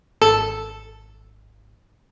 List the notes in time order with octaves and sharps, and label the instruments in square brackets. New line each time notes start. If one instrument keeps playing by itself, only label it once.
[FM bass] G#1 [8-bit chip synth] A4